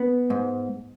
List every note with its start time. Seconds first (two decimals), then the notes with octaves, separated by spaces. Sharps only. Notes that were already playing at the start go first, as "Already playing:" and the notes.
Already playing: B3
0.30 G#2